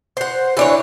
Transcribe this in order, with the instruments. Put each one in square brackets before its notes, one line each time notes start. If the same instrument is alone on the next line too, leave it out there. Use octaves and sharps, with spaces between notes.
[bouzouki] C5 F#5
E3 D4 C#5